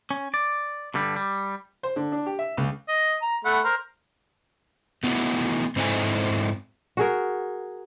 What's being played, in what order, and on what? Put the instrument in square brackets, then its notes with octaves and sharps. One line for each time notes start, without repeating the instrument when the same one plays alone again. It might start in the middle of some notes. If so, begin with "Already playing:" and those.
[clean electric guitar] C#4
D5
G2 D3 G3
G3
[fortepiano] C5
D3
D4
G4
E5
C#2
[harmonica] D#5
A#5
A3 F#5 B5
A#4 C5 F6
[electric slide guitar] A3 B3 D#4 E4 F#4
G#2 C4 D#4 E4 A4 G#5
[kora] F#4 G#4 A#4